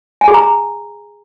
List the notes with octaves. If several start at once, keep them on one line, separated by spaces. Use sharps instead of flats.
G#5
G#4
A#5